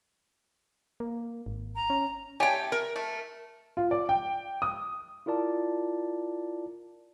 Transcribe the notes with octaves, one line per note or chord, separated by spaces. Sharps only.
A#3
G#1
A#5
C#4
A3 G4 C#5 G5 G#5
A#4
A3
F4
D5
G5
D#6
E4 F4 A#4 D5 A5